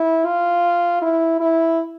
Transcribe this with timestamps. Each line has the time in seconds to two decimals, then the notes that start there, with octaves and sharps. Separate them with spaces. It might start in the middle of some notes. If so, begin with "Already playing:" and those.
Already playing: E4
0.25 F4
1.02 E4
1.40 E4